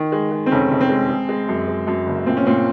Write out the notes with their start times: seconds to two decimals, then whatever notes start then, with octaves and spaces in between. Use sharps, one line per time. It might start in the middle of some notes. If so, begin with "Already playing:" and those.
Already playing: D#3
0.12 G#3
0.31 G#3
0.46 C4
0.51 F1 C#4
0.71 F1
0.81 C4
0.89 G#3
1.09 G#3
1.29 G#3
1.49 F#2
1.68 G#3
1.87 F#2
2.07 F#1
2.26 A#2 C4
2.37 C#4
2.46 A#2 C4